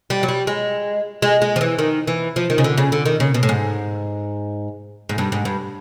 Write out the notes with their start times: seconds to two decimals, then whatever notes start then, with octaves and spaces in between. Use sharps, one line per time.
0.10 G3
0.23 F#3
0.29 G3
0.47 G#3
1.22 G#3
1.42 G#3
1.56 F3
1.61 E3
1.79 D#3
2.07 E3
2.36 F3
2.50 D#3
2.58 C#3
2.64 D3
2.78 C#3
2.92 D3
3.06 D#3
3.20 C#3
3.34 B2
3.43 A2
3.49 G#2
5.09 G#2
5.18 G2
5.32 G#2
5.45 G2